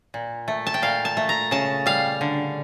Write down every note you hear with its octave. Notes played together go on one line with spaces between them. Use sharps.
A#2
A3
A5
G5
A#2 F5
A5
A3
A#5
C#3 A5
G3 F5
D3